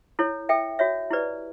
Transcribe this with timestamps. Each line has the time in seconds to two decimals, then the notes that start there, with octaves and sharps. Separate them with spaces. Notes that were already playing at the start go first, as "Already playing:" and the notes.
0.19 E4 A4 C#5
0.49 A4 E5 G5
0.79 F#4 C#5 E5
1.11 E4 G4 B4 D5